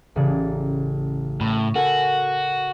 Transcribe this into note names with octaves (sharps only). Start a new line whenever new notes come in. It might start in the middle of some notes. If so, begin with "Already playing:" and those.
A1 C#3 D5
A2 B5 C#6 A#6
F#4 A4 A#4 G#5